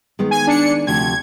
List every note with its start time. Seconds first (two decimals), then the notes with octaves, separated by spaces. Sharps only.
0.19 D#3 G#3 B3
0.31 G#5
0.47 D4 C#7
0.87 D2 C3 F3 G#6